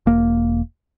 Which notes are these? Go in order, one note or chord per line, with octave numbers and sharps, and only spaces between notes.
E1 A#3